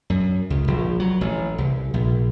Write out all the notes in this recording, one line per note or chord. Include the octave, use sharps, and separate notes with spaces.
F#2
C#2
A#1
F#3
A1
C2
A#1